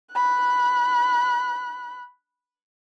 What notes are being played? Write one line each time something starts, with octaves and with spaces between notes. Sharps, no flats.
B5 F#6